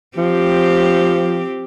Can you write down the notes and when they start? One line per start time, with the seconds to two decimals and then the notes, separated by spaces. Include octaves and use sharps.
0.17 F3 C4 G4